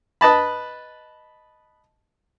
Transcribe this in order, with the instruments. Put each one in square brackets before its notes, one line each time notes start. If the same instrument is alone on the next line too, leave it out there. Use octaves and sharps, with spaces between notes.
[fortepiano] B4 D#5 A5 B5